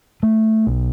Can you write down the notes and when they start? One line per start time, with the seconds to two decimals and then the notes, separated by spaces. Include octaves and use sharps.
0.23 A3
0.67 B1